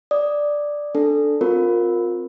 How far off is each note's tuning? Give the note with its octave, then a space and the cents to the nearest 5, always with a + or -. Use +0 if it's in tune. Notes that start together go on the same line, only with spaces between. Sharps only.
D5 +0 D#6 +0
D4 +0 A4 +0
C4 +0 F4 +25 A#4 +0